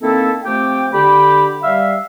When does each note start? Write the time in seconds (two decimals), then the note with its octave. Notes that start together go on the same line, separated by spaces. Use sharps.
0.02 D#3 A#3 C4 E4 A4
0.45 F3 A3 C4 G4 G5
0.93 D3 G4 B5
1.63 G3 E5 F5